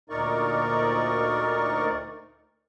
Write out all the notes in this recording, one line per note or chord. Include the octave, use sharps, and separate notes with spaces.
D2 A#2 D#4 A#4 D5 C#6